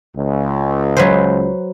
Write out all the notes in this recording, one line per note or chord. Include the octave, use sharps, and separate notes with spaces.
C#2
F#3 B4 C5